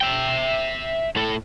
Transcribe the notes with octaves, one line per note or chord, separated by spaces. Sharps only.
E5 G5
A2 A4